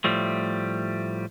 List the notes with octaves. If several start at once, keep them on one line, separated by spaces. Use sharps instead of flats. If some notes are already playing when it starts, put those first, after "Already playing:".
A2 F3 G3 A3